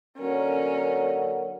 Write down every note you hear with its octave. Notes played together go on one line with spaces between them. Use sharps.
D3 F#3 A#3 C#4 A#4